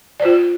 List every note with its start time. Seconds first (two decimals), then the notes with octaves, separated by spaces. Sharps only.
0.20 D5
0.22 C5
0.25 F4